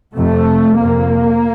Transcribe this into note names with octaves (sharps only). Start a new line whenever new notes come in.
F2 C3 A3
F2 C3 A#3